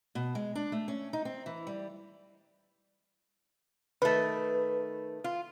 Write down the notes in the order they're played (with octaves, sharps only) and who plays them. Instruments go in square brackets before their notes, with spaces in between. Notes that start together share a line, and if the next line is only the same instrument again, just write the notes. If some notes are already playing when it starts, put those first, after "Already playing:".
[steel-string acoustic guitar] B2
G#3
D4
A3
C#4
D#4
C4
E3
G3
[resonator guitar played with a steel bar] D#3 A3 [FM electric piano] B4
[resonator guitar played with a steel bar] F4